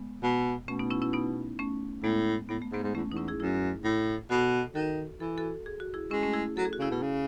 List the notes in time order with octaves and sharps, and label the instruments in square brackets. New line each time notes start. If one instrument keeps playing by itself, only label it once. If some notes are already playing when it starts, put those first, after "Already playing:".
Already playing: [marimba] G#3 B3
[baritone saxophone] B2
[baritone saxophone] B2 [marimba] A3 C#4
[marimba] B3 D#4
C#4 E4
C#4 E4
B3 D#4
A3 C#4
[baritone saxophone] A2 [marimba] G#3 B3
[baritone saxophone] A2 [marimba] B3
[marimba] A3
[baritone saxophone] G#2 [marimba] G#3 B3
[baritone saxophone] G#2
[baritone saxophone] E2 [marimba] A3 C#4
[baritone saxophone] E2 [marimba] D#4
[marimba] C#4 E4
E4 G#4
[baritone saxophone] F#2 [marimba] E4 G#4
[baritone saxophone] A2
[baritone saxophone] B2 [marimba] F#4 A4
[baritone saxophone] D#3 [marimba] F#4 A4
[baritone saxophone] E3 [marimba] A4
[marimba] F#4 A4
G#4
F#4
E4 G#4
[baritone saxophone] G#3 [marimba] C#4 E4
[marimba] A3 C#4
E4 G#4
[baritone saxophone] F#3 [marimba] A4
[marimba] G#4
F#4
[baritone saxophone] C#3 [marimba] E4 G#4
[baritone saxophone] B2
C#3